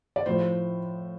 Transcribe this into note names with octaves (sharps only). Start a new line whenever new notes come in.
D5
A2 F3 C5